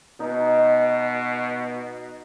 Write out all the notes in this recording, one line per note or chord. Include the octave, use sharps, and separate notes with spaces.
B2 D#4